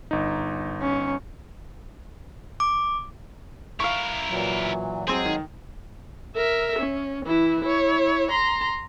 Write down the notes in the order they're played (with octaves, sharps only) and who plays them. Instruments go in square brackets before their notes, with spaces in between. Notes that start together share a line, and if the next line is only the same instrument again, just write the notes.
[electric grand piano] G1 D#4
[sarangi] C#4
[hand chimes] D6
[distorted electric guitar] E4 A#4 [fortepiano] F5 C#6
[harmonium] A#2 E3 F#3
[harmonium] F#3 G#3 [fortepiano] C4 C5 [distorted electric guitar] G#4
[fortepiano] D#3
[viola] A#4 E5
C#4
E3 E4
E4 C#5
A#5 C6